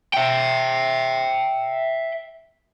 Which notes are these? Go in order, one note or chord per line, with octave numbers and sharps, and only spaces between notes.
E5 G5